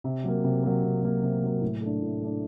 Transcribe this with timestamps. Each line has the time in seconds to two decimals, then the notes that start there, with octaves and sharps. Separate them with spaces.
0.04 C3
0.24 F#3 A#3
0.44 C3
0.63 F#3 A#3
0.83 C3
1.03 F#3 A#3
1.23 C3
1.42 F#3 A#3
1.62 A2
1.81 A3 D4
2.02 A2
2.21 A3 D4